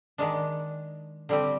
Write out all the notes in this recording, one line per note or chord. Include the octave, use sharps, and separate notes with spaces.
D#3 G#3 D4
D3 G3 C4 G4